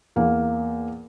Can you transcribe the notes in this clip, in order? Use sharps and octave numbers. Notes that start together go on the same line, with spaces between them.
E2 A#3